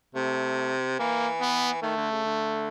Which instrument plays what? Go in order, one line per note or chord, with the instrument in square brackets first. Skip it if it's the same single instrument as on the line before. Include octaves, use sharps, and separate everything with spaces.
[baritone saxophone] C3 [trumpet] A3
[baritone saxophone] E3 [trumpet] A#3
[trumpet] B3
[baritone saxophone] D#3 [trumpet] A3
[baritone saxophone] D3
C#3
D3